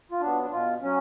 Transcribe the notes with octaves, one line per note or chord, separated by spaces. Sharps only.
F4
F#3 B3 D4
D4
B2 F4
F#3 C#4